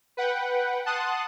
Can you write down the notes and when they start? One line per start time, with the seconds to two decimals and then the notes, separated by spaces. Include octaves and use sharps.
0.17 B4 F#5 G5
0.86 F#5 A5 C6 D#6 F#6